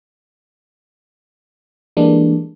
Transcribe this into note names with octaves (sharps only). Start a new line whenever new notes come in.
E3 G3 G#3 A#3 D4